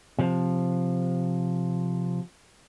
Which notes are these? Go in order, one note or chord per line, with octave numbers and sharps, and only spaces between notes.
C3 F3